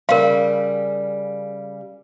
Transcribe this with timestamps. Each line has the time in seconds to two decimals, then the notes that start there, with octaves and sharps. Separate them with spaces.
0.09 C#3 G3 A#4 F5